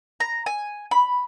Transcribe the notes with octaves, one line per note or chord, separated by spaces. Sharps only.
A#5
G#5
B5